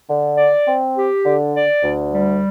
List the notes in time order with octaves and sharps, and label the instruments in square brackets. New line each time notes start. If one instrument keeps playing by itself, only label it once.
[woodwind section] D3
D5
C4
G4
D3
D5
D2
G3